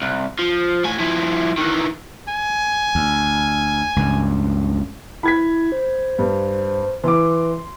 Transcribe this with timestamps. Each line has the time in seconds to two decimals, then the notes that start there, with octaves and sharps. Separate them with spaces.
0.02 C2
0.39 F3
0.85 A2 G#5
1.00 F3 E4
1.58 D#3 E3
2.28 G#5
2.95 D2
3.96 C#2 G2
5.23 E4 B5 G#6 B6
5.72 C5
6.19 G2
7.04 E3 C6 D6